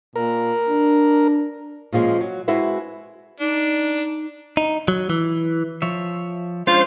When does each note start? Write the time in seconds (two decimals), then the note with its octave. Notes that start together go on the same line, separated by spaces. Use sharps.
0.16 A#2 A#4
0.69 D4
1.92 A#2 C#3 F3 G#3
2.21 F#3
2.48 G#3 C4 E4 F#4 B4 E5
3.40 D4 D#4
4.57 D#4
4.88 F#3
5.10 E3
5.82 F3 C#5 E5
6.67 G#3 C#4 D4 F4 C5